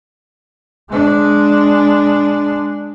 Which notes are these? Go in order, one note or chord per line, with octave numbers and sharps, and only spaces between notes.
G#3 D4